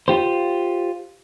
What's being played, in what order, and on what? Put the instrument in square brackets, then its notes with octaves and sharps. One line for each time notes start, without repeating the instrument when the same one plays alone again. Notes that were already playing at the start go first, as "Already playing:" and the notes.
[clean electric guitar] F4 G4 C5